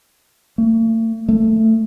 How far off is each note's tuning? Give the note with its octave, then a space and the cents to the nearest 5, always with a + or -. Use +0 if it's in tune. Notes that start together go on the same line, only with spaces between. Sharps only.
A3 +45
A3 +15